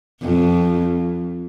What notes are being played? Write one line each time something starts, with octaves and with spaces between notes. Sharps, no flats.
F2